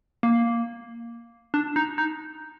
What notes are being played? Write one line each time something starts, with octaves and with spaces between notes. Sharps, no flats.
A#3
D4
D#4
D#4